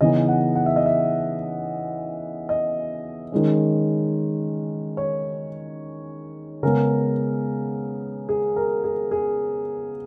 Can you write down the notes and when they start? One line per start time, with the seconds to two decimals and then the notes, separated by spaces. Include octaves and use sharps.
0.01 C#3 E3 B3 D#4 D#5
0.29 F#5
0.55 F#5
0.66 E5
0.76 D#5
0.86 E5
2.49 D#5
3.32 D#3 G#3 C#4
4.97 C#5
6.63 C#3 G#3 B3 A#4
8.29 G#4
8.56 A#4
8.84 G#4
9.11 G#4